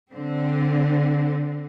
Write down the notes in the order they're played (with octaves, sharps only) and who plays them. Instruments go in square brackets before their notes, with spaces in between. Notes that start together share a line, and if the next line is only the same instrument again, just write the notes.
[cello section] D3 C4